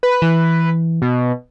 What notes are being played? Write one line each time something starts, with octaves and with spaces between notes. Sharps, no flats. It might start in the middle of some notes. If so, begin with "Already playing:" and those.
B4
E3
B2